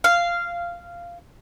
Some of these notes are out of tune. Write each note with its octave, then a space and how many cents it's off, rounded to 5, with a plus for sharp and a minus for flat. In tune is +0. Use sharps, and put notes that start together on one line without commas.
F5 -10